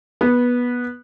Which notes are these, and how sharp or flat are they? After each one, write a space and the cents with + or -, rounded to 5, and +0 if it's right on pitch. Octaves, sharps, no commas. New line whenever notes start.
B3 -15